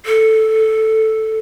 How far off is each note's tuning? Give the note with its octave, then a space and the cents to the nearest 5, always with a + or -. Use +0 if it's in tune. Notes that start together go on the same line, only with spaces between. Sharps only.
A4 +0